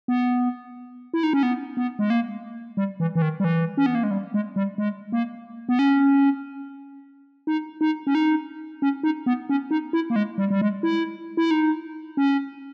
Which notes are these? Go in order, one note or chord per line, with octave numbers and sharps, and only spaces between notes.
B3
E4
D#4
C#4
B3
B3
G#3
A#3
G3
E3
E3
D#3
G3
E3
C#4
B3
A#3
G#3
G3
G#3
G3
G#3
A#3
B3
C#4
D#4
D#4
C#4
D#4
C#4
D#4
B3
C#4
D#4
E4
A#3
G#3
G3
G3
G#3
E4
E4
D#4
C#4